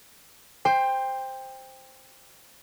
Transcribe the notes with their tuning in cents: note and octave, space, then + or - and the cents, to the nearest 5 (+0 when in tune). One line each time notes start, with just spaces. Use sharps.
C5 +0 G5 +20